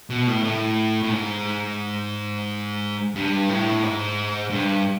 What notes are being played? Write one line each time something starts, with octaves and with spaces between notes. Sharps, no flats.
B2
A2
A2
A2
G#2
G2
A2
G#2
G2